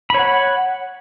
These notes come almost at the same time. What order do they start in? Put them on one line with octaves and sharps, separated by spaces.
B5 C#5 F#5